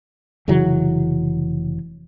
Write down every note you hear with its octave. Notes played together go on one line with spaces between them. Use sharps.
F1 C#3 E3 F#3